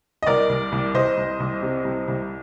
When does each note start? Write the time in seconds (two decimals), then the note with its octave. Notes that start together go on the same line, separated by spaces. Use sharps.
0.23 D#5
0.27 C2 A#4 D5
0.49 C2
0.72 C2
0.94 C2 C5 D#5
1.17 C2
1.40 C2
1.62 C3
1.85 C2
2.08 C2